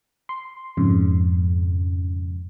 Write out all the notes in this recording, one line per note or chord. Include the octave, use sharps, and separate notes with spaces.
C6
F2 G#2 C#3